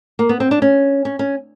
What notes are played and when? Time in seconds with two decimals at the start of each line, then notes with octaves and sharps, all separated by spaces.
0.19 A#3
0.29 B3
0.40 C4
0.51 D4
0.62 C#4
1.05 C#4
1.19 C#4